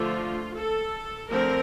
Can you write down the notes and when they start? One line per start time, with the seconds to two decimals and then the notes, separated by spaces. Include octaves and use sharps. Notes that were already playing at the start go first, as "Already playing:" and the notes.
Already playing: D3 F3 A3 F4
0.56 A4
1.31 D3 F3 A3 C4 A#4